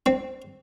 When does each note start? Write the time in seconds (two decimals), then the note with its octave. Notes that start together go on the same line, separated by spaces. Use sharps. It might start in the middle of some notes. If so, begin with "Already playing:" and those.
0.06 C4